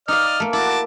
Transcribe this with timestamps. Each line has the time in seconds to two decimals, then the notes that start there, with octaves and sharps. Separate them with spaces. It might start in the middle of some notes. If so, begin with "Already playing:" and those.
0.08 D#4 D5 D#5 F5 F6
0.40 A3 A#3
0.53 E4 F#4 A5 D6